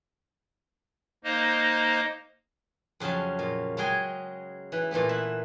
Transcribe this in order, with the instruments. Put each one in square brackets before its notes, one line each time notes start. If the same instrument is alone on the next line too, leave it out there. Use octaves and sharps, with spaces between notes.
[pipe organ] A#3 D#4 C5 D#5
[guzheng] F2 C#3 F#3 C#4 A5
A#2
C#3 F#3 G#3 G#4 G5 G#5
E3 B4
A#2 E3 A3 B3
E5 F#5